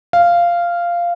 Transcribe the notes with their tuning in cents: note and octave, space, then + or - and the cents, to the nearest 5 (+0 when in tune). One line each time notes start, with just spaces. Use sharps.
F5 -10